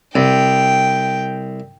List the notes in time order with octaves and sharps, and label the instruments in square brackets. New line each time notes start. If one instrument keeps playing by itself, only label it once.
[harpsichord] C2 [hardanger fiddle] G5